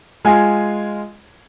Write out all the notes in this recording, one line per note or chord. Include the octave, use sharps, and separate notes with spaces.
G#3 F4 G#5